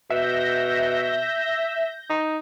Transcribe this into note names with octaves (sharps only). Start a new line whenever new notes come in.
B2 E5 G6 A#6
D#4